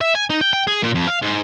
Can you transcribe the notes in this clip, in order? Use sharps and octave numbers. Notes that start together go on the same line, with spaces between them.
E5
G#5
D#4
G5
G5
G#4
A#2
F2
F5
G#2